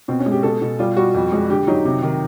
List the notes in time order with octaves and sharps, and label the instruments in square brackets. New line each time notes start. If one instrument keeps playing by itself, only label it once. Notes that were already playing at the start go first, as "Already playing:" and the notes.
[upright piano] B2 C4
C#4
G#3
G4
B2 A4
B2
G3 F4
G3 F#4
F2
G#3
D3 G4
F#3 D#4
C3
D#3